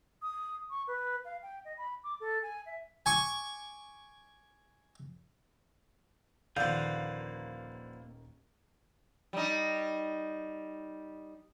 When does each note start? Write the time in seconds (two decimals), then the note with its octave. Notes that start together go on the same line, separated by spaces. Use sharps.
0.22 D#6
0.70 C#6
0.87 B4
1.25 F5
1.43 G5
1.65 D#5
1.78 B5
2.04 D6
2.20 A4
2.42 G#5
2.66 E5
3.06 G#5 C#6 D6
6.57 D#1 D3 D#3 F3 A#3 B4 F5 G6
9.33 G3 D#4